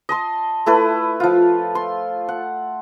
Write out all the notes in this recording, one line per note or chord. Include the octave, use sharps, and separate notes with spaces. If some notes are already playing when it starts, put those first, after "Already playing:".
D#5 A5 C6
A3 E4 A4 B4
F3 F4
C6
F#5